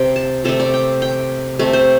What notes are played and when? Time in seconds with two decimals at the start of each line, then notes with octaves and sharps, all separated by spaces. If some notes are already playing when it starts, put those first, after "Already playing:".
Already playing: C3 G5
0.16 A5
0.44 C3 A3 A4
0.60 D5
0.74 G5
1.02 G5
1.59 C3 A3
1.73 C5